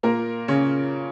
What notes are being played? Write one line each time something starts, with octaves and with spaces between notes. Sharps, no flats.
A#2 A#3 A#4
C#3 C#4